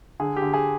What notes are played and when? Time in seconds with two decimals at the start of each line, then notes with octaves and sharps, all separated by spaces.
0.20 D3 G#4
0.36 G4
0.42 D3
0.54 G#4